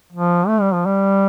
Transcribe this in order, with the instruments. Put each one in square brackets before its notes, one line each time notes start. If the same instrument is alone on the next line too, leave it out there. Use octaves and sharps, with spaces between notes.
[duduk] F3
A3
G3
F3
G3